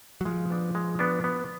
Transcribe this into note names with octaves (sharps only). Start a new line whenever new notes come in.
F#3
F3 G#3
B3 D4
G#3
B3 D4
B3